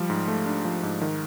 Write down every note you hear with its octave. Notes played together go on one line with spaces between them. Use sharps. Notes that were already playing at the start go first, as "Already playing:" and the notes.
Already playing: F3 G3
G#2
A3
D4
F3
G#2
D#3